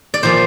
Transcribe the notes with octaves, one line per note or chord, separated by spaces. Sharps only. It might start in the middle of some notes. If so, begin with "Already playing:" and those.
D5
A#2 F3 A#3 C5